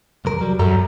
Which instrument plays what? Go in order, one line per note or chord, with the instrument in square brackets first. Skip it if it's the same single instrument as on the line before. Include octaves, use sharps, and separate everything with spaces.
[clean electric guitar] C2 F2 A#4
F#3 G3
[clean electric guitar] B1 A4 A#5 [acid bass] F#2